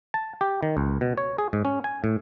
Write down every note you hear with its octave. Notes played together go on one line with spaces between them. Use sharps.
A5
G4
D#3
C#2
B2
C#5
G#4
G#2
C#4
G#5
A2